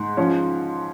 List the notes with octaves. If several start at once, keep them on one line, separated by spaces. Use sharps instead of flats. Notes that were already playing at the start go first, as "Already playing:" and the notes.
Already playing: G#2
F3 C#4